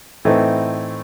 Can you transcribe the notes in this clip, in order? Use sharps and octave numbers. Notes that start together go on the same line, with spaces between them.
A2 E3 A3 C4 D#4